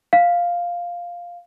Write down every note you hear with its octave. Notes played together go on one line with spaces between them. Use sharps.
F5